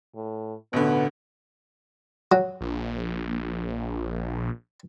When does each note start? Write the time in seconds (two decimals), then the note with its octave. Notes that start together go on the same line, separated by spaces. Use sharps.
0.16 A2
0.73 A1 B2 D3 B3
2.32 F#3
2.61 A#1